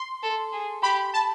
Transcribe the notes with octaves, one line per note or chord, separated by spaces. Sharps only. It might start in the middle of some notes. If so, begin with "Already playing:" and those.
Already playing: C6
A4
G#4
G4 B5
A5